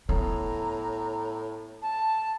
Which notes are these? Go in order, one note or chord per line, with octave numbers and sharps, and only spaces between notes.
A2 B3 A#5
A5